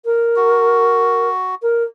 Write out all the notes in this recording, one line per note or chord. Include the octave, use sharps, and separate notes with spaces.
A#4
F#4
A#4